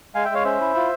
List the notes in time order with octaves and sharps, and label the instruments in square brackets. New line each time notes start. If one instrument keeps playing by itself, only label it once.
[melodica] G#3 F5 G#5
E5 G5
G#3 C#5 F5
C#4 C5 E5
E4
F4